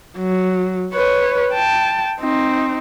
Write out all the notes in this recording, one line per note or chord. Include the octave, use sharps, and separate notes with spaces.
F#3
B4 C#5
G5 A5
C4 D#4